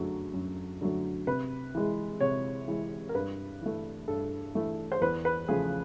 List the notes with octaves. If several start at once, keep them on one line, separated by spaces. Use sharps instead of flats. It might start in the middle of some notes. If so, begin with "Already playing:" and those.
Already playing: F#2 D3 F#3 A3
F#2
D3 F#3 A3
C3 B4
E3 G#3
C3 C#5
E3 G#3
A#4
G2 B4
E3 A3
G2 A4
E3 A3
C5
E2 B4
B4
C#3 F3 A3 G#4